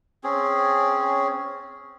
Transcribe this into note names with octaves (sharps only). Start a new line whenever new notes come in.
C4 C#4 G#4